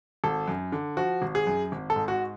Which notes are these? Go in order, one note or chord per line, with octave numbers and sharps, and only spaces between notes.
G#1 A4
F#2
D3
F3 F#4
G#1
G#4
F#2
G#1
A4
G#2
F#4